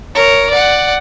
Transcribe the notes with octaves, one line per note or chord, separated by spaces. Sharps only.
A#4 C#5
D5 F#5